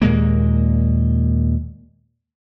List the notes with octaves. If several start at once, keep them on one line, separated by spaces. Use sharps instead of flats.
D#2 A#2 G#3 A#3